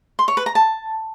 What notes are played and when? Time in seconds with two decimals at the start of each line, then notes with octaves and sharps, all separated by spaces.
0.19 C6
0.28 C#5
0.37 B4
0.46 A#5
0.55 A5